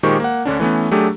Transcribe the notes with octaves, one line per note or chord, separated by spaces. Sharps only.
A#2 D#3 G#3 G4 C5 C#6
A#3 F#5
D2 D3 C#4 D4
E3 A3 B3 C#4
F#3 A3 D4 G4 G#4